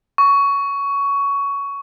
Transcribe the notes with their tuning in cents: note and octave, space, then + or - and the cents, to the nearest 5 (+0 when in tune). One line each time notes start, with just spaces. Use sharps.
C#6 +15